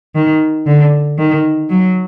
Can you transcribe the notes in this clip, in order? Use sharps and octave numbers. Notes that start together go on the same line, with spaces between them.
D#3
D3
D#3
F#3